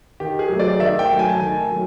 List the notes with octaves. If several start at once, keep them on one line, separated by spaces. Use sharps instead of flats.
D#3 G4
G#4
F#3 A3
D5
D#3 E5
G5
F#3 A3
G#5
A5
D#3 G#5
F#3 A3